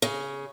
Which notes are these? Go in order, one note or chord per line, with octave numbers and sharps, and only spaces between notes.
C#3